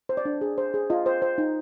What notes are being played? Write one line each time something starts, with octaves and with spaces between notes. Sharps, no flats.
C5
D5
D4
G#4
C5
G#4
F4 D#5
C5
C5
D#4